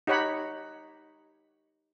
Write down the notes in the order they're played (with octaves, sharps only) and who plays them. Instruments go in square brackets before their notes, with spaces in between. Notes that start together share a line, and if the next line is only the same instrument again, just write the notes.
[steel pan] D#4 G4 C#5 F#5 B5